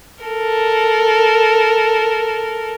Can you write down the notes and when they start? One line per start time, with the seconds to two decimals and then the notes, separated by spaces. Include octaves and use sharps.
0.24 A4 A#4